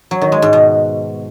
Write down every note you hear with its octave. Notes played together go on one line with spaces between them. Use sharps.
F#3
D#3
G#3
G#2
B2